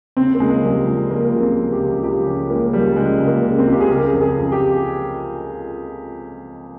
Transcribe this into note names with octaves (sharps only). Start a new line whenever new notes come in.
C#3 C4
A#3
C#2 G#3
F3 G3
C#2 G#3
F3 A#3
C#2
C4
F3
G4
C#2
C#2 G4
F3 C#4
C#2 A#3
F3 G3
C#3 G#3
C#2
A#3
C#3
C4
C#2
G4
G#4
C#3 A#4
F2
G#4
F2
G4